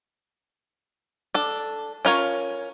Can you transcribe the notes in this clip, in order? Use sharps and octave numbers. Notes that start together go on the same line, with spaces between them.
D4 A4
C#4 F4 A#4 C#5